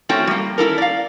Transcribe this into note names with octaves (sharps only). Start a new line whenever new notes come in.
A3 C4 C#4 E4 F#4 G5
G3 A#3
C#4 E4 A4 A#4
D5 F5